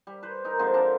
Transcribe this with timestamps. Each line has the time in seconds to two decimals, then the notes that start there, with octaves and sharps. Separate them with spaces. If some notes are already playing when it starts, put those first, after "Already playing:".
0.07 G3
0.23 B4 C5
0.45 D#4 A#4
0.59 D3 F3 G#3 C4
0.74 D4 A4 A#4